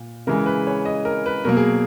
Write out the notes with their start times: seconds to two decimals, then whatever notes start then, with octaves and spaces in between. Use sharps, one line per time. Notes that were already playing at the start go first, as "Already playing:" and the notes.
Already playing: A#2
0.27 C#3 E3 G#3 A#4
0.46 B4
0.67 C#5
0.85 D#5
1.05 A#4
1.26 B4
1.45 B2 F#3 A#3 A#4
1.57 G#4